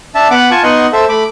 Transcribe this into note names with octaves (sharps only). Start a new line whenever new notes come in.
D4 E5 A5
B3 B4 F#5 D6
F4 G#5 A5 C#6
B3 D#4 D#5 F#5 C6 C#6
A4 C5 E5
A3 B5 D6